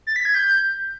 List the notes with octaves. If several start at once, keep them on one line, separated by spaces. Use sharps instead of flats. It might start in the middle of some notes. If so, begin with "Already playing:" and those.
A6
B6
G#6
G6